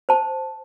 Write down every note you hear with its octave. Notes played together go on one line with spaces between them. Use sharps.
C5 A5